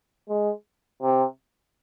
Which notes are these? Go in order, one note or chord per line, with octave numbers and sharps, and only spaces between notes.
G#3
C3